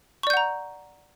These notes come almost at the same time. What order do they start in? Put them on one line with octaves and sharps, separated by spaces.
C#6 D5 G6 F#5 A#5